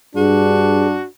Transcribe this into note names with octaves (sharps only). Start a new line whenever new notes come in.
G2 D4 F#4 G#4